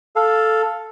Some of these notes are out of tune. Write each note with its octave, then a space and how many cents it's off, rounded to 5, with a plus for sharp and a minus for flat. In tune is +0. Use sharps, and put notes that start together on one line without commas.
A4 +0 F5 +0 A5 +0